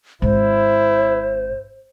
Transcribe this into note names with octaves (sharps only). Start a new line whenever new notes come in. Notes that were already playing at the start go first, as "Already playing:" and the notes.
G#1 C4 E4 C5